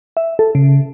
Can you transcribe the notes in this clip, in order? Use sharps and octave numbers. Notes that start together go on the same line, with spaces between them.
E5
A4
C#3